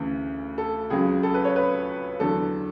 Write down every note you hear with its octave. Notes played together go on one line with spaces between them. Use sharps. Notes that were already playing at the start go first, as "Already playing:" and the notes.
Already playing: D2 C#3 E3
A4
C#2 C#3 F#3 G#4
A4
B4
C#5
B4
E2 D3 F#3 A4